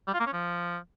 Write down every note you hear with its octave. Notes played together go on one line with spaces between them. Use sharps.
G3
F4
A#3
C#4
F3